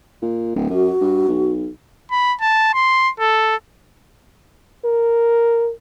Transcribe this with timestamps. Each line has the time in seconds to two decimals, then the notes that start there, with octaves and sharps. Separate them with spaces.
0.22 A#2
0.55 D1
0.70 F#2 F#4
1.01 G2
1.28 B1
2.11 B5
2.41 A5
2.74 C6
3.20 A4
4.85 A#4